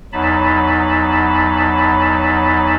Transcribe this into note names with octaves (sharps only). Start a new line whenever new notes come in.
E2 F#3 D#4 A5 B5